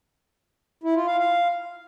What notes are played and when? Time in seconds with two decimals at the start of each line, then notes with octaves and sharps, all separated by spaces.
0.84 E4
0.95 F4
1.07 F5
1.19 F5